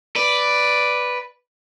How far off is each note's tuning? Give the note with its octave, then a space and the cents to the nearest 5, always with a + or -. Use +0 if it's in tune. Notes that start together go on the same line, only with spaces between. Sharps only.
B4 +0 D5 +0